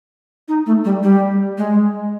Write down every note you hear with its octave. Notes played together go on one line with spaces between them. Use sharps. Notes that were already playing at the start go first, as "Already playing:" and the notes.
D#4
A3
G3
G3
G#3